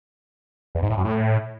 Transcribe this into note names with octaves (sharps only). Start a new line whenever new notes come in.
E2
G#2
A2
F#2
A2